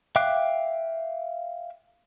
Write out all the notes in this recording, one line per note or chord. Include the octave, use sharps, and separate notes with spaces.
E5 F5 G5 D6 F#6